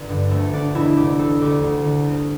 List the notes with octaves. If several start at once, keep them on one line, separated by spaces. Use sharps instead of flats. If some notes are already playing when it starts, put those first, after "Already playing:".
Already playing: G1
G2 D3
D2 A3
D3 D4
E1 E4
D2 C3 G4
E1 A4
D2 D3 G4
D2
D3
C2